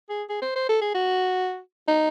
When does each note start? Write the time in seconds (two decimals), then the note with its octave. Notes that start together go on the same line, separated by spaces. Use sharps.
0.09 G#4
0.29 G#4
0.42 C5
0.56 C5
0.69 A4
0.81 G#4
0.94 F#4
1.88 D#4